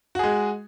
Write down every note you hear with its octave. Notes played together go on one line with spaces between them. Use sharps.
G#3 F#4 G#4